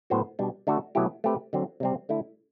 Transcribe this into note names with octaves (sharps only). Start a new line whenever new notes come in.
A2 F#3 B3 F#4 C5
B2 G3 D4
D3 A3 D4 F#4 A4
B2 F#3 A3 E4 G4
A3 C4 G4 B4
D3 F#3 C4
C3 G3 C4
D3 A3 E4